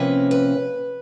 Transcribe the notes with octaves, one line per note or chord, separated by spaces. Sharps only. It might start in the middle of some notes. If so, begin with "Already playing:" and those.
Already playing: C3 F3 A#3 C#4 B4
B4